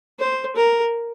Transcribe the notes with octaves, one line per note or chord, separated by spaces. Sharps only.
C5
A#4